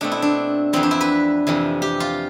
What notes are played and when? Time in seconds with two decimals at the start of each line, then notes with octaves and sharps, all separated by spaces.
0.01 B2 A3 C4 D4
0.12 E4
0.22 D4
0.73 F2 E3 B3 C4
0.83 D4
0.91 E4
1.01 B4
1.47 F2 C3 E3
1.82 G4
2.00 F4